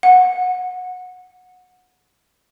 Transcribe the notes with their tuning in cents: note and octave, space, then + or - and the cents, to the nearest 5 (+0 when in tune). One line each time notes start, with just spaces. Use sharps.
F#5 -20